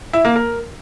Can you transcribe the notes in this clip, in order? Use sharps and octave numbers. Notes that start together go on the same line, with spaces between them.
E4
A#3
A#4